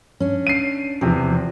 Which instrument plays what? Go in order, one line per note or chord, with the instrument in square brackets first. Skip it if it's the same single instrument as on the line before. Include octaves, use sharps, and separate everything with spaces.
[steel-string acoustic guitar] C#4 D4
[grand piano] C7 D#7
[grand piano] E2 C3 [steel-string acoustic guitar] F3